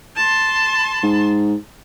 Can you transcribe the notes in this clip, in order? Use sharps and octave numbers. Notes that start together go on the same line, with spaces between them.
A5 C6
G#2